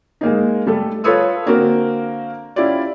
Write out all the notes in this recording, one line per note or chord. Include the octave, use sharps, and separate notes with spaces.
G#3 A#3 D#4
G3 A3 A4
F4 A4 B4 C#5 D#6 E6
D3 A#3 C4 F#4 A#4
C#4 E4 F4 G4 D5